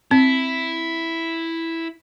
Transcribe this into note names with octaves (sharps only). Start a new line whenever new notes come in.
C4 E4